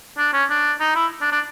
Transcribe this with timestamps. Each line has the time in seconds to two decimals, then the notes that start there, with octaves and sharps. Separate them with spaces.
0.18 D4
0.34 C#4
0.50 D4
0.80 D#4
0.96 E4
1.22 D4
1.32 D4